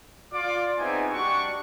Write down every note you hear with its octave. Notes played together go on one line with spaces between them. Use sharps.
F4 D5 D6
B3 C4 D#4 G#4 E5 G#5
G3 D4 F#4 C#6